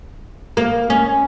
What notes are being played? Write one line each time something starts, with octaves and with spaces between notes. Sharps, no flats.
A#3
C#4